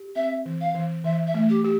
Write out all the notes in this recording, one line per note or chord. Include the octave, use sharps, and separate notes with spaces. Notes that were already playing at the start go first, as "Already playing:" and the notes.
Already playing: G4
C4 E5
E3
F5
E3
E3 E5
E5
A3
G4
G4